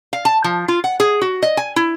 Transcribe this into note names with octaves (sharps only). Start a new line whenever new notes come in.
F5
A5
F3
F4
F#5
G#4
F#4
D#5
G#5
E4